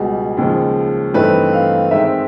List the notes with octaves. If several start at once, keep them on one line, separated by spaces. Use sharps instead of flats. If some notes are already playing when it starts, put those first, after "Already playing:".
Already playing: C#2 B2 G3 G#4
D#2 C#3 F3 G#3
G2 E3 A3 C4 D#4 B4
F5
G#2 D#3 G#3 C4 E5